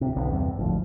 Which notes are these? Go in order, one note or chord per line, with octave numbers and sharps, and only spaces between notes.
D#1 C3
B1 D3
E2 G2 C3
G#1 D2 F3